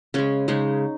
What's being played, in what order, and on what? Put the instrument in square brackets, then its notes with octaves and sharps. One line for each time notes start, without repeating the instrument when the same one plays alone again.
[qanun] C#3 G#3 C#4
C#3 G#3 D#4